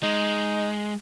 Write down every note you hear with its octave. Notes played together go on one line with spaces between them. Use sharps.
G#3 D#4